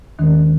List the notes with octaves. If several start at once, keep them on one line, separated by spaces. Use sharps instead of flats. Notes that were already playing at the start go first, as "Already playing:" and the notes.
D#2 D#3 G#3 C#4